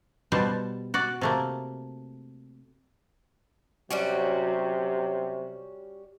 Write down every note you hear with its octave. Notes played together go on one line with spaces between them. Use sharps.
B2 G3 C5 A5
F#4 D5 F#5
C3 A3 A#3
C3 F#3 G3 C#4 F#4